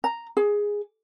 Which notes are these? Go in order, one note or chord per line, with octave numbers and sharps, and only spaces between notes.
A#5
G#4